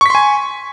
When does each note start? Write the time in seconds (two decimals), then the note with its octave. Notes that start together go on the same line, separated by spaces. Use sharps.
0.01 C#6
0.06 B6
0.10 C6
0.15 G#5